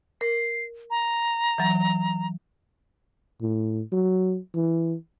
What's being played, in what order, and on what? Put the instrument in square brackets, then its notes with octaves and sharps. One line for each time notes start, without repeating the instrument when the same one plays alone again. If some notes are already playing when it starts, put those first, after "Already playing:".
[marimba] A#4 [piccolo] C7
[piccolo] A#5
[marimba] E3 F#3
[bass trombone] A2
F#3
E3